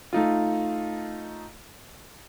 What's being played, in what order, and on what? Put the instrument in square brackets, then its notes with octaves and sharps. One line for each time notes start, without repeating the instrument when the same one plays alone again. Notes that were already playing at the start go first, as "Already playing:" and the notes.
[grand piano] A3 D#4 F4